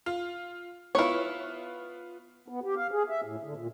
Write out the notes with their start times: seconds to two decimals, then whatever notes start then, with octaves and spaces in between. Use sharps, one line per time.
0.06 F4
0.95 B3 E4 F4 C#5
2.48 B3
2.64 G4
2.77 F5
2.91 G#4
3.09 E5
3.24 A2
3.43 D3
3.56 A#2